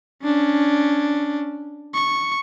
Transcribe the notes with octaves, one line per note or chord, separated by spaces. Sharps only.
C#4 D4
C#6